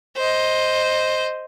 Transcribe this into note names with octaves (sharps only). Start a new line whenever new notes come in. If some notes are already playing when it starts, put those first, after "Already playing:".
C5 D#5